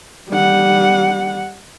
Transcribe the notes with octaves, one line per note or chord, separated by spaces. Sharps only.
G3 F#5